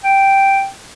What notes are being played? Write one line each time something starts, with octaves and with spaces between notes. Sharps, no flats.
G5